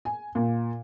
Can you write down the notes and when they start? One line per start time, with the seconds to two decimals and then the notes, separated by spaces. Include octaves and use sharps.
0.05 G#5
0.35 A#2